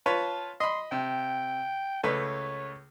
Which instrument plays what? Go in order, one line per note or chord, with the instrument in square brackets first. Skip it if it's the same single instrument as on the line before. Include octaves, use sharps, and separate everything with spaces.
[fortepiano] F4 B4 C#5 [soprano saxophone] A5
[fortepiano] D#5 B5 [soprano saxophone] C6
[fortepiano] C3 [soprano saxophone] G5
[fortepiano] C#2 A3 B4 [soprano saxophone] C#5